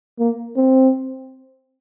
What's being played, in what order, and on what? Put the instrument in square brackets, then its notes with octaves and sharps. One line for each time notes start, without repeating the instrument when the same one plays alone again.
[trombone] A#3
C4